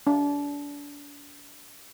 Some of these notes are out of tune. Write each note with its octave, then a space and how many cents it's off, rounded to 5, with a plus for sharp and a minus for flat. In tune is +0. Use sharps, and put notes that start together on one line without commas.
D4 -35